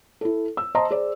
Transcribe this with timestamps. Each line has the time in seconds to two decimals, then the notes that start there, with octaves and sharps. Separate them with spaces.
0.21 E4 A4
0.57 E6
0.75 C5 D#5 A5 A#5 C6
0.91 G#4 C5 D5